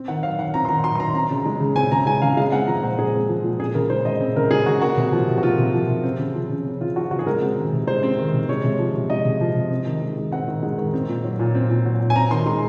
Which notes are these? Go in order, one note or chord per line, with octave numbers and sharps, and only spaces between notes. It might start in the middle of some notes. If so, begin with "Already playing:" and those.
Already playing: C4
D#3 F#5
F#3 F5
D#3 F#5
C4 A#5
C6
D#3 A#5
F#3 C6
C6
D#3 A#5
C4 A#5
C#3
G#3
C#3
C4 G#5
C#3 A#5
G#3 G#5
C#3 F5
G#3 F5
C4 F#5
F3 A#5
A#2 C5
G#3 G#4
C4
F3
A#2
C4 G#4
C#3 A#4
G#3 C5
C#3 D#5
C4
C#3 A#4
G#3 G#4
C#3 F#4
A#3 F#4
C3
F3
C3
F#4
A#3 F4
C3
F3
C3
C4
C#3
F3
C#3
C4
C#3 F4
F3 F#4
C#3 F#4
G#4
G#3 A#4
C4
D#3
C3
G#3 C5
C4
D#3
C3
G#3 C#5
C3
F3
C3
G#3 D#5
C3
F3
C3
C4
D#3
G#3
D#3
C4 F#5
D#3
G#3
D#3
C4
A#2
F#3
A#2
C4
A#2
F#3
A#2
G#5
C4 A#5
D#3 C6
G#3 C6